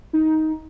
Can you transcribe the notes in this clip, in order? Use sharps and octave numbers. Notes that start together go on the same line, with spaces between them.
D#4